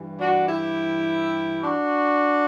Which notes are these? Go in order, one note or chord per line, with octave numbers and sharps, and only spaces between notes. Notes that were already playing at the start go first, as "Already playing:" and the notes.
Already playing: G2 E3
D4 F#4
E4 G4
D4 F#4